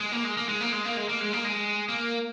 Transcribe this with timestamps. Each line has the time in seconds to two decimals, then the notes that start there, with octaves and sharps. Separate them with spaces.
0.01 G#3
0.12 A#3
0.25 G#3
0.37 A#3
0.48 G#3
0.61 A#3
0.72 G#3
0.85 A#3
0.97 G#3
1.09 A#3
1.21 G#3
1.33 A#3
1.45 G#3
1.89 A#3